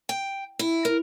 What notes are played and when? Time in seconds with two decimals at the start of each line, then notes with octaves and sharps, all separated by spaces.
0.09 G5
0.59 E4
0.85 A#4